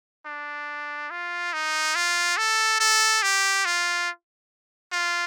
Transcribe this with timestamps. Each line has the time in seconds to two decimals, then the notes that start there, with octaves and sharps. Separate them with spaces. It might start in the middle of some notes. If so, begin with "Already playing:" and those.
0.26 D4
1.11 F4
1.53 D#4
1.95 F4
2.37 A4
2.81 A4
3.23 G4
3.66 F4
4.92 F4